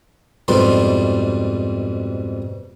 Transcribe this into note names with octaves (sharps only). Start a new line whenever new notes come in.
F2 G#2 B2 G3 C6